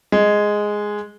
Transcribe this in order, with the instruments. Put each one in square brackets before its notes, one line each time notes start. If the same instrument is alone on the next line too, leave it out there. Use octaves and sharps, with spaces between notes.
[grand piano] G#3